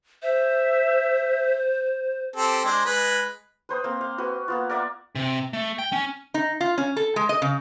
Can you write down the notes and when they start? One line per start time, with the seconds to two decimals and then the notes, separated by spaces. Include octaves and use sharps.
0.23 C5 E5
2.36 C4 G4 A4
2.65 G#3 D4 C5
2.85 G#3 B4
3.69 B4 C5 B5 D#6
3.84 A#3 C4
4.01 F5
4.18 F#4 B4
4.48 A#3 B3 F4
4.69 A#4 D5 E5 F#5
5.15 C3
5.53 A3
5.79 G5
5.92 C#4
6.34 D#4
6.61 F4
6.78 C#4
6.97 A4
7.16 G#3
7.29 D#5
7.42 C#3